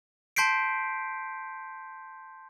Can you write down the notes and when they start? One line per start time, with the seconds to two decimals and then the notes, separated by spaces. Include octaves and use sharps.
0.36 A5 C6 G6 B6 C7 D7